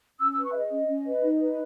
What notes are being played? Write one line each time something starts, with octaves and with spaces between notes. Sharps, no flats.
C#4 E6
B4 E6
C#6
G#4 D#5 E5
C#4
C#4
B4
D#4
B4